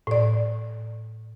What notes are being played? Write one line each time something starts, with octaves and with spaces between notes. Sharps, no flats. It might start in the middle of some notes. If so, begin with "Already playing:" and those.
A2 D5